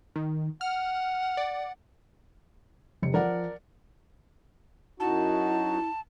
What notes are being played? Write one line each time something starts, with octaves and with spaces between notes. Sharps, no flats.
D#3
F#5 F6
D5
F1 C#7
F3 A#4 D5 F#5
F#2 D#4 E4 F#4 A5